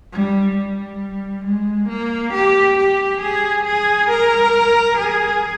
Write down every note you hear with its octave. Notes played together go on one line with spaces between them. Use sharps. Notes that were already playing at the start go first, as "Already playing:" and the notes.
G3
G3
G#3
A#3
G4
G4
G#4
G#4
A#4
G#4